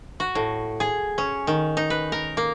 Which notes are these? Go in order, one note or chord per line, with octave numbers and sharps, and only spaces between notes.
F#4
A2
G#4
C#4
D#3
D#4
B4
A#4
A#3